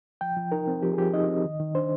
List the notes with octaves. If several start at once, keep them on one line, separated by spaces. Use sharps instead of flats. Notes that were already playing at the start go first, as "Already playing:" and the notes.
F3 G5
F3
D#4 A#4
C4
F3 G4
G#4
F3 G4
D#4 D#5
C4
D#3
D#3
D4 C5